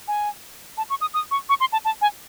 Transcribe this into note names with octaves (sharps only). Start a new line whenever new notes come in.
G#5
A5
C#6
D#6
D#6
C#6
C#6
C6
A5
A5
G#5